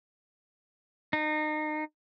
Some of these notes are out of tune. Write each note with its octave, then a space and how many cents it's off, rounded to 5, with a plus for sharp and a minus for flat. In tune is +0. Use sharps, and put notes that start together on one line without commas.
D#4 -30